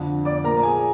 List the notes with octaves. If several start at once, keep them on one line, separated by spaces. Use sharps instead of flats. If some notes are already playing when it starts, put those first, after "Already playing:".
Already playing: F2 D3 F3
D5 D6
A#2 F3 A#4 A#5
G#4 G#5